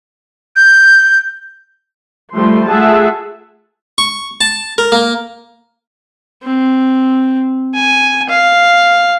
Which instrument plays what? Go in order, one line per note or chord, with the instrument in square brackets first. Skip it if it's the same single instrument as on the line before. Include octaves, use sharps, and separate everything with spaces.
[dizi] G6
[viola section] F3 G3 A3 C6
A3 F4 G#4 E5 F#5 A5
[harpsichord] C#6
A5
A#4
A#3
[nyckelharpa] C4
G#5
F5